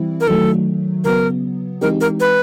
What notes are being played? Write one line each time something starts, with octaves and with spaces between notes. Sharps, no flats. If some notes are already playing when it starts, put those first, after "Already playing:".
Already playing: E3 G3 C4 E4
A#4
D#3 F#3 A3 A4
C#3 F#3 B3 A#4
E3 G#3 C4 D#4 G4 A#4
A#4
B4